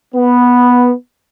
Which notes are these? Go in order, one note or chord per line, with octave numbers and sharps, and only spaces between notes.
B3